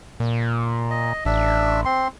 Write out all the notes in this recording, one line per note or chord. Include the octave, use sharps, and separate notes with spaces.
A#2
D#5
A1 D4 E5
C4 C6